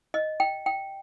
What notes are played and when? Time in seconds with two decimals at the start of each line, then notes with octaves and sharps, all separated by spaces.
0.14 D#5
0.40 G5
0.66 G5